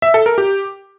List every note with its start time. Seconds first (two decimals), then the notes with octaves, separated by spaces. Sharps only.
0.02 E5
0.14 A4
0.26 A#4
0.38 G4